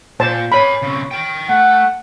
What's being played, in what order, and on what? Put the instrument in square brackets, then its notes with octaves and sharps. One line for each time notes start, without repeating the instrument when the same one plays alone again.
[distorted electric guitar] A#2 [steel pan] C5 A5
[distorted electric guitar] A#4 G#5 [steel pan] C#5 B5
[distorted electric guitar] C#3 C4
A#4 G5
[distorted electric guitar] A3 [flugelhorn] F#5